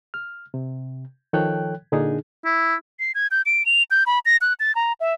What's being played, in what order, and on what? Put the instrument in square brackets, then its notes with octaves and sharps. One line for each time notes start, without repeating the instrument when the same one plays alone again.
[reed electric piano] F6
C3
D#3 F3 A4 C#5 G5 F#6
A#2 D3 D4 D#4 G#4
[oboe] E4
[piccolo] C7
G#6
G6
D7
F7
G6
B5
A#6
F#6
A6
A#5
E5